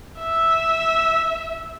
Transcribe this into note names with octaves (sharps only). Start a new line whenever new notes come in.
E5